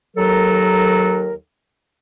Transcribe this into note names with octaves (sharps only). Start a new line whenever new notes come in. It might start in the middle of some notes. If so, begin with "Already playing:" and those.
D#2 F#3 A4 A#4